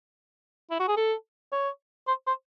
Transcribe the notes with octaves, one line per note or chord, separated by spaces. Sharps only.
E4
F#4
G#4
A4
C#5
C5
C5